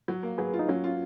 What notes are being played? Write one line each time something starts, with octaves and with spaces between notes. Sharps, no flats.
F#3
A#3
F#3 G#4 B4
F4
D#4
F#3 C#4
F4